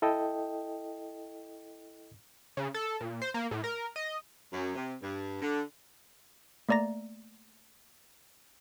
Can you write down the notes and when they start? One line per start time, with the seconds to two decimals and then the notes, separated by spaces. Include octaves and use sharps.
0.02 E4 A4 D#5 G5
2.57 C#3
2.74 A4
3.01 A#2
3.22 C5
3.34 A#3
3.51 A2
3.64 A#4
3.96 D#5
4.53 F#2
4.75 C3
5.01 G2
5.42 D3
6.69 A3 A#3 D5 A#5 A#6